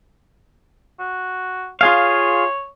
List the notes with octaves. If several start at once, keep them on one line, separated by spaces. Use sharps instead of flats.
F#4
F4 G#4 C#5 F5